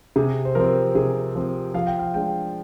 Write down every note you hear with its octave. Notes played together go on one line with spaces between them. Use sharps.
C3 G#4
C5
F3 C4 A#4
C3 G#4
F3 C4
F3 F5
G5
F5
G#3 D4 G5